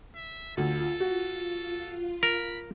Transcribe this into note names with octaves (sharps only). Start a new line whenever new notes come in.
E5
D2 F4 A4
F#4
A#4 B5